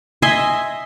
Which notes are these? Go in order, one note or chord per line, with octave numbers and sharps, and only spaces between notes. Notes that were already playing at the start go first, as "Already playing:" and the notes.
D#5 E5 G#5 C6